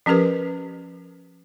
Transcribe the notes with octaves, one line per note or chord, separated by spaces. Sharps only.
F3 C#4 G4 A#4 B4